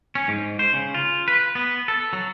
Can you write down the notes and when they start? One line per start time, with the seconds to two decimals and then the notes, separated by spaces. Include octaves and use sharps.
0.15 C#4
0.28 G#2
0.59 C5
0.73 C#3
0.94 F4
1.28 B4
1.55 B3
1.88 A4
2.13 F#3